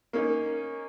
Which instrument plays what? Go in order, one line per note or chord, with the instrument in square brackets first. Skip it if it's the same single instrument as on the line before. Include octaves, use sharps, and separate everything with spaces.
[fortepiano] A#3 C#4 D#4